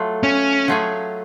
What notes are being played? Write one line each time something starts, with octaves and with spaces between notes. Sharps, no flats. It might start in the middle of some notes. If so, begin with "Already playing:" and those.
Already playing: F#3 A3 F4
C#4
F#3 A3 F4 G#4